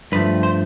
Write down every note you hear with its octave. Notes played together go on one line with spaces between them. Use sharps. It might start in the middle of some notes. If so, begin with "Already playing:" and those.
G2 F3 A3 B4
C5